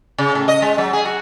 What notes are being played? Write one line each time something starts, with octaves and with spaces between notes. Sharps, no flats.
C#3
A2
D#5
G#3
F#3
G#4
F#4